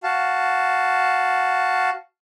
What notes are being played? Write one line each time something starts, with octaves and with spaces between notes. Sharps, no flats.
F#4 F5 A5